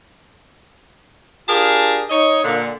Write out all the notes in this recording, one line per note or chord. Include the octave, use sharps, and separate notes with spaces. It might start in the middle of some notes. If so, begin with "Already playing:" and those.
D4 F4 G4 G#4 A#4 A5
D#4 C#5 D#5
A#2 D3